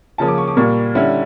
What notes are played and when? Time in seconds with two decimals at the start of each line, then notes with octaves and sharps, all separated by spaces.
0.18 C#3 F3 A#3 C#4 A5
0.28 D6
0.38 C#6
0.48 D6
0.57 A#2 G3 A#3 C#6
0.95 D3 G3 C#4 E4